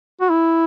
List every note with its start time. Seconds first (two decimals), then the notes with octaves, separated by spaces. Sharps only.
0.21 F#4
0.30 E4